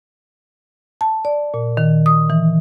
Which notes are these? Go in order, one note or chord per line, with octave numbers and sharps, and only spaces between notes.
A5
D5
A#2
D#3
D#6
E3